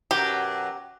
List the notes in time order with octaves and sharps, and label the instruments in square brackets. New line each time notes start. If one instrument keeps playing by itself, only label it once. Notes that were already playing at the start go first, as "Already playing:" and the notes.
[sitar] F#2 B2 F#3 [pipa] G4